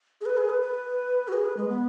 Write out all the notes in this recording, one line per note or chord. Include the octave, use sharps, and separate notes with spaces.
G#4
B4
G#4
B4
B4
F#4
G#4
B4
G#3
B3